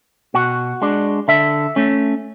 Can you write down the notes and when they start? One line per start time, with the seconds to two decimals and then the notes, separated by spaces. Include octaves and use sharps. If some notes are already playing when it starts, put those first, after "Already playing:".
0.34 B2 F#4
0.82 G#3 D4
1.28 D3 E5
1.76 A3 C#4